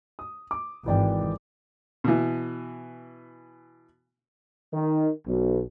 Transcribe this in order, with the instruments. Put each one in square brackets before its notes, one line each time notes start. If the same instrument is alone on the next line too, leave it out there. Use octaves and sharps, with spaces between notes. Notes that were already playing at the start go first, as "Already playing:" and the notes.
[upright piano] D#6
D6
[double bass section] G#1 [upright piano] E3 D5 G5
[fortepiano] B2 E3
[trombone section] D#3
B1